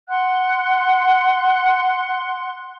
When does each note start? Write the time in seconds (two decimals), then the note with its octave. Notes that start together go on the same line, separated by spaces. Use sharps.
0.09 F#5 C6 F#6